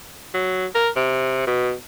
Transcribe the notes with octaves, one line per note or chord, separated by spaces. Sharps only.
F#3
A#4
C3
B2